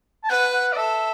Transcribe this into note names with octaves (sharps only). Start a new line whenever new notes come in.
A5
B4 F#5
F#5
D5
A4 E5